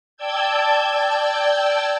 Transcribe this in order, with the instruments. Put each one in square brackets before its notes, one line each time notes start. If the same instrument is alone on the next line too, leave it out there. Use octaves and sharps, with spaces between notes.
[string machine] D5 G5 A5 E6 G6 G#6